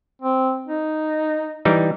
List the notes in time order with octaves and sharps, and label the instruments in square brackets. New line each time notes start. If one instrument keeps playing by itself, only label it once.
[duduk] C4
D#4
[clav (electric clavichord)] E3 G3 D#4